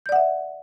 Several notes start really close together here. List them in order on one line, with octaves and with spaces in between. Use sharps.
G6 D5 F#5 E5